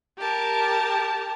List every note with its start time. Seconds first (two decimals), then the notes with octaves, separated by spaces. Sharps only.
0.17 G4 A#4 A5